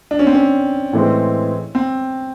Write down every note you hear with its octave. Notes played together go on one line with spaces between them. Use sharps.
D4
C#4
C4
C#4
A2 E3 G#3 C4
C4